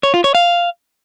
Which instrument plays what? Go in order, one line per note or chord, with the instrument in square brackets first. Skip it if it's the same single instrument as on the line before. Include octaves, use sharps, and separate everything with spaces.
[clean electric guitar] C#5
F4
C#5
F5